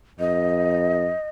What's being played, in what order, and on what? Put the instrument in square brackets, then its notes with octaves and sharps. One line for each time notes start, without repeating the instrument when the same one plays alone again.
[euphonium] F2 [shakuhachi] D#5